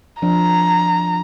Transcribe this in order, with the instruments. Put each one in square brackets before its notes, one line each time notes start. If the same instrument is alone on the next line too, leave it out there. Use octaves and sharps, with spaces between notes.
[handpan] F3 D4 [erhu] A#5